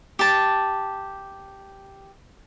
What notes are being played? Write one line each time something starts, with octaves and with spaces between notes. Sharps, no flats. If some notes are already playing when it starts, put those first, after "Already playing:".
G4 A5